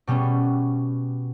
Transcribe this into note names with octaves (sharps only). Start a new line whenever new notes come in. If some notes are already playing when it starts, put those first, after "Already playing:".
B2 G3 B3 C#4